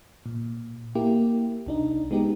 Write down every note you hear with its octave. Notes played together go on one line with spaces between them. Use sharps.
A#2
A#3 E4 G4
C2 D4 D#4
G#3 B3 D#4 G4